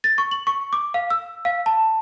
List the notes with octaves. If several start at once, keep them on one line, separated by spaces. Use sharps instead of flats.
A6
C#6
F#7
C#6
D6
F5
E6
F5
A5